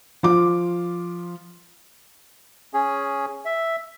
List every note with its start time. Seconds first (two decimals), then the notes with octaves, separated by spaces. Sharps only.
0.23 F3 F4 D6
2.74 C#4 G#4
3.46 E5